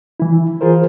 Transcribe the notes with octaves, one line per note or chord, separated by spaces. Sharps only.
E3 E4
E3 F4 G#4 A#4 C5